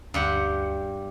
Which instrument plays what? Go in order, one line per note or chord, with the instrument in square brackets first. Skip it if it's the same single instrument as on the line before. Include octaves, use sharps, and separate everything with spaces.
[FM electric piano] D2 [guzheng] G2 G4 F#5